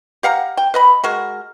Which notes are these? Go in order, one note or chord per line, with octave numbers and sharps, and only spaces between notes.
G4 F5 F#5 A#5
G5
B4 D#5 B5
G#3 F#4 A#4